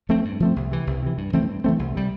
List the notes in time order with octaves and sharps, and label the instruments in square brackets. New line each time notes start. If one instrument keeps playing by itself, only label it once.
[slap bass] F3 A3 C4
G2
F3 A3 C4
C2
C3 E3
C2
C3 E3
G2
E3 A3 C4
G2
E3 A3 C4
C2
C3 G3